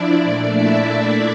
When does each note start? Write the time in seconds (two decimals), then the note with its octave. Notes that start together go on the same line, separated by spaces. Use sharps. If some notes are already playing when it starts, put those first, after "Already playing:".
Already playing: F3 D4 E4 D5
0.24 A#2 A3
0.57 E4 E5